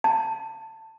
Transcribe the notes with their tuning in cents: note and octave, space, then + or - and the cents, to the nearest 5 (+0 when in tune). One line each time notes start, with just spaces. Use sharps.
A5 +20